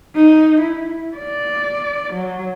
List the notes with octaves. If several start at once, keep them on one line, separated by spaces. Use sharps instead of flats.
D#4
E4
D5
F#3